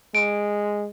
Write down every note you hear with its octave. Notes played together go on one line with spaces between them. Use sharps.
G#3 D7